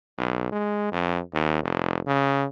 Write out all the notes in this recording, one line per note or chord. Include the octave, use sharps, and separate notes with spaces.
B1
G#3
F2
D#2
F1
C#3